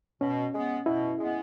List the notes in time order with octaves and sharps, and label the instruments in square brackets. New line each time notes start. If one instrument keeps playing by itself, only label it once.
[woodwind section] B2 [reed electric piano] C#4
[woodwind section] G#3 B3
[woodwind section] B2 [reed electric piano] E4
[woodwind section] G#3 B3